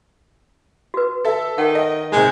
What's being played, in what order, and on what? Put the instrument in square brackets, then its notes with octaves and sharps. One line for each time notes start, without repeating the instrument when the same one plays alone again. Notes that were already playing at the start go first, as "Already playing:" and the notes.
[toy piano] F#4 B4
[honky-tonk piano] A4 E5
[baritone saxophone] D#3 [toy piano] F#5 G5
[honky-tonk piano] D#5
[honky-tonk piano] G#2 C3 [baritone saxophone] G#3